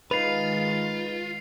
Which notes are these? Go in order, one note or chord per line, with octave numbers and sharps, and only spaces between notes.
D#3 G#3 D#4 F4 B4 C7 F7